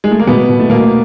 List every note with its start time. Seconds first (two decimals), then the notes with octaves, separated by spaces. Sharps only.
0.04 G#3
0.11 A3
0.19 A#3
0.27 B2 B3
0.49 B2
0.59 A3
0.70 B2 A#3